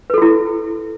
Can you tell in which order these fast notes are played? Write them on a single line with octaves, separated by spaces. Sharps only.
B4 A4 F#4 E4